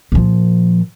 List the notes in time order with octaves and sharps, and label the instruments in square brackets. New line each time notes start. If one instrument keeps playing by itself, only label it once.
[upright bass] A#2 F3